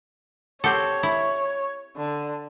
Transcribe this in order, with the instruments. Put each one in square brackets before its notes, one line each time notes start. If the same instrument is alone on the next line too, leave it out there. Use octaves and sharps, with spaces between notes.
[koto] C4 G4 A4 [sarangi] C#5
[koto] E4
[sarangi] D3